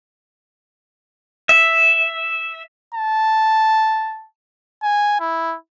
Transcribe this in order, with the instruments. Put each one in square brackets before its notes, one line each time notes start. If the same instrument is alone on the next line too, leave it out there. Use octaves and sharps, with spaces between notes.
[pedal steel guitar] E5
[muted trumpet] A5
G#5
E4